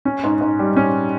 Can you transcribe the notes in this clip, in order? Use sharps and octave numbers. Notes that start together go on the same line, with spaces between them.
C#4
G#2
G#2
G3
C#4